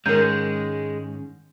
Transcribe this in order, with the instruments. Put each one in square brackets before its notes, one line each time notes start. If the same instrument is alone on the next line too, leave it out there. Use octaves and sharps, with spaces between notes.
[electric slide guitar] G#2 D#3 C#4 [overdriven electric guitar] G#3 [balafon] A#4 A#5 [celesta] G6